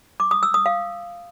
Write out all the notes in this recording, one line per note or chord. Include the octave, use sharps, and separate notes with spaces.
D6
D#6
E6
D#6
F5